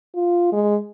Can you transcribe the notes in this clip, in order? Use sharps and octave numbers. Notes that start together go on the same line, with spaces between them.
F4
G#3